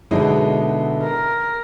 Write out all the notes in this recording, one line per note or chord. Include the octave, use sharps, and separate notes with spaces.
B2 D3 F#3 G#3 D#4 E4
A#4